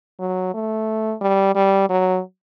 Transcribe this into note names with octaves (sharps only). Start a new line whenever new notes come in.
F#3
A3
G3
G3
F#3